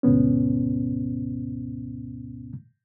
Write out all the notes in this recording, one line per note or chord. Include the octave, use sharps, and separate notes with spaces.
D2 G#2 B2 B3 C#4